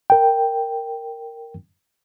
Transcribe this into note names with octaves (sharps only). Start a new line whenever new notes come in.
A#4 G5